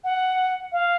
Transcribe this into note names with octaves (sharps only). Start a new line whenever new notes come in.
F#5
F5